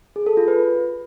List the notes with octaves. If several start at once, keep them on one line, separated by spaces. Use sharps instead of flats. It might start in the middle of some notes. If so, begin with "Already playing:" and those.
G#4
A4
F4
B4